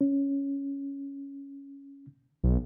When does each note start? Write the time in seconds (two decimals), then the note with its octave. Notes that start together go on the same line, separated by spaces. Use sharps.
0.01 C#4
2.44 B1